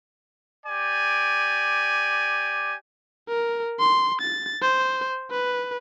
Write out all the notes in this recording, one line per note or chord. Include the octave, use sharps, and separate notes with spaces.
G4 D5 G#5
A#4
C6
A6
C5
B4